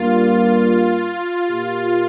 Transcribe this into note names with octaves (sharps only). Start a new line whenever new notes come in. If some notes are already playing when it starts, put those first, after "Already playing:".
Already playing: G2 G3 A#3 F4
A#2 A#3 G4